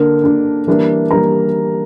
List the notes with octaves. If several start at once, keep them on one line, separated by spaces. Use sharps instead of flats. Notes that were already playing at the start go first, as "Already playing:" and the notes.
Already playing: D3 A#3 D4 A#4
D3 A#3 D4
E3 G3 A#3 D4
E3 G3 A#3 D4 A#4 A#5